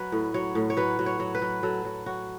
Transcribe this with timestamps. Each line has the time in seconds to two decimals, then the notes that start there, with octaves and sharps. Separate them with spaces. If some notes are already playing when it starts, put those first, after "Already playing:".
Already playing: F#3 B4
0.12 A2
0.34 F#3 C#5
0.55 A2
0.70 C#5
0.77 F#3 B4
0.99 F#3
1.06 C#5
1.20 F#3
1.35 B4
1.42 F#3
1.63 F#3 A4
1.85 F#3
2.06 F#3 F#4